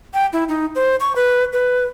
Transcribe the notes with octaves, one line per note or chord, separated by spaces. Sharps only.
G5
E4
D#4
C5
C#6
B4
B4